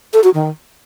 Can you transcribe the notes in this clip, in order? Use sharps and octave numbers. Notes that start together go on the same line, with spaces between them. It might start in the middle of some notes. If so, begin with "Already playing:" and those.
A4
F#4
D#3